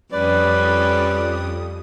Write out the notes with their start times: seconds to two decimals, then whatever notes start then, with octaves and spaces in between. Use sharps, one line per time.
0.13 F2 G3 C#4 B4 D5 D#6